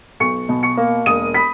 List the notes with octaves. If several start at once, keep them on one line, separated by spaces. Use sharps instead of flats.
B1 C#6 C#7
B2
C#6 C#7
A#3
E1 D#6 D#7
B5 B6